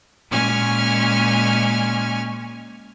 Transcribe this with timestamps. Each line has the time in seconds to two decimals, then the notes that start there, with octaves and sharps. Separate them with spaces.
0.29 A#2 G#3 C#4 G#5 F6